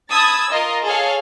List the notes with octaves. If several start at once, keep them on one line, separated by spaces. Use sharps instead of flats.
A5 B5 D#6 E6 G#6 A6
F4 A#4 D#5
G#4 A4 C#5 F5